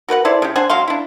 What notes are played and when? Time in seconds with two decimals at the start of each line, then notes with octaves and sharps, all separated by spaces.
0.08 F#4 A#4 B4 F#5
0.25 E4 A4 C5 D5
0.42 C#3 G4
0.56 D4 C5 F#5 G#5
0.70 F#3 G#3 F5 C6
0.88 D4 E4